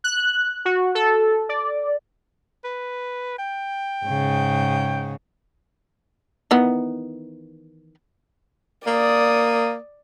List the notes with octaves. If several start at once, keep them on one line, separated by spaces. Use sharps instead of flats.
F#6
F#4
A4
D5
B4
G5
G#2 C#3
D#3 E3 B3
A#3 D5 D#6